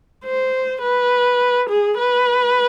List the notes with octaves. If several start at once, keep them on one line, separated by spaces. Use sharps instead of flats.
C5
B4
G#4
B4